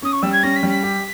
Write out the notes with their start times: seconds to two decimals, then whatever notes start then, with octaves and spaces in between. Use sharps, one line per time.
0.02 C#4 D#6
0.13 C#6
0.22 G3 E6
0.33 G#6
0.43 C#4 A#6
0.56 B6
0.63 G3
0.70 B6
0.83 G4